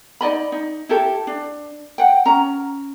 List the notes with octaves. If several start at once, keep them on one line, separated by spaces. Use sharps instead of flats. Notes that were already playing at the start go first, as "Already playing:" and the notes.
D#4 D5 D#5 B5
D#4
E4 G4 A4
D4
F#5 G5
C#4 A#5